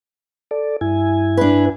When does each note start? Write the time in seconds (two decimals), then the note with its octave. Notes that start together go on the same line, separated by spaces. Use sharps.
0.51 A4 D5
0.81 G2 E4 G#5
1.37 D4 B4